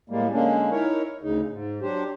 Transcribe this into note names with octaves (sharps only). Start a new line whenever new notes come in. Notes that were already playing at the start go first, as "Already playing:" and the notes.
A2 G3 G#3 A#3
D3 G#3 A#3 C#4 D4
D#4 E4 A#4 C#5
D2 C#3 D#4
G#2
F#3 D4 G4 C5